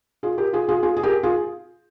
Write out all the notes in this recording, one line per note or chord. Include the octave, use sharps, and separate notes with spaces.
F4 G#4
G4 A#4
F4 G#4
F4 G#4
F4 G#4
G#4
G4 A#4
F4 G#4